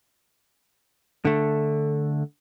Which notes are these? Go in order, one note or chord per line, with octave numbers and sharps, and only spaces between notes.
D3 A3